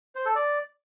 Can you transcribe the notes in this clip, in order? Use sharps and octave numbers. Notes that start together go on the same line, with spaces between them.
C5
A4
D5